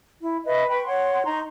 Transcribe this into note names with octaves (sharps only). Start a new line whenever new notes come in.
E4
B4 D#5 E5
B4 G5 B5 C#6
C#5 F#5 C6
D#4 A#5 C6 C#6